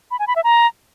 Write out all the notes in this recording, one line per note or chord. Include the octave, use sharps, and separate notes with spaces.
B5
G#5
B5
E5
A#5